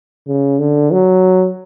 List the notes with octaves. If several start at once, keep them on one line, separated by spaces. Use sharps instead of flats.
C#3
D3
F#3